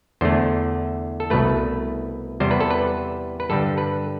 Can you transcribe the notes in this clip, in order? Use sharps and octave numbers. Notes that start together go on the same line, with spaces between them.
E2 D3 A3 C5
A4
C2 B2 A3 B4
E2 C3 G3 C5
B4
A4
B4
B4
G2 D3 G3 A4
B4